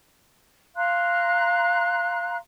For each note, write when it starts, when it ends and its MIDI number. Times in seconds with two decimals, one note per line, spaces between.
0.76 2.35 77
0.76 2.35 82
0.76 2.35 84
0.76 2.35 90